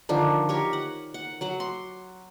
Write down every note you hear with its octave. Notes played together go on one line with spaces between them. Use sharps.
D3 D#3 F3 D4
G4 A#4 C#5
F#5
F#5
F#3 F#5 D6
C6